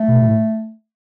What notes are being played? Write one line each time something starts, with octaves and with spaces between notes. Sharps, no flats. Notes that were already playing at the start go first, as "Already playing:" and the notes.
Already playing: A3
B2
B2
A2